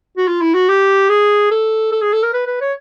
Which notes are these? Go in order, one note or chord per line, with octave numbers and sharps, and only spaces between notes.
F#4
F4
E4
F#4
G4
G#4
A4
A4
G#4
A4
A#4
B4
B4
C#5